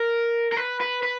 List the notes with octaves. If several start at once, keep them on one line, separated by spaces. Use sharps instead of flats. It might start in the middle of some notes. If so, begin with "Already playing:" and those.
Already playing: A#4
A#4
B4
B4
B4